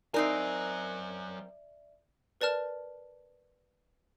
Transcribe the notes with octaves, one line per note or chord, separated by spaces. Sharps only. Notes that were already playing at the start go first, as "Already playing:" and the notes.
F#3 C4 D#4 A#4 D5 E5 G#5
A#4 B4 D5 A5 F6